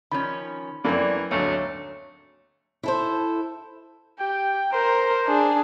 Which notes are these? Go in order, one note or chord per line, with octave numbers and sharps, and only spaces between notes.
D#3 F3 C#4 B5
F#2 E3 A3 A#3 C4 D5
G#1 D2 F#3 A3 A#3 C#5 A#5
E4 A4 C5
G4 G5
A#4 C5
D4 G#4